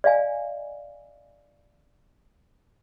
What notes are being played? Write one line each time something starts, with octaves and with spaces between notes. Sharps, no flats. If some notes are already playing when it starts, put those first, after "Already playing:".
D5 D#5 F5 G#5